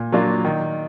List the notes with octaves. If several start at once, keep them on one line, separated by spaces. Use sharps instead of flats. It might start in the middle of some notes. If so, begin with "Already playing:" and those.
Already playing: A#2
F#3 A#3 D4 F4
D#3